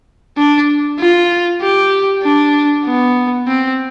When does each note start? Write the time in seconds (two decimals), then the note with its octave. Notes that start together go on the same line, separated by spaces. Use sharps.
0.37 D4
0.99 F4
1.62 G4
2.23 D4
2.85 B3
3.48 C4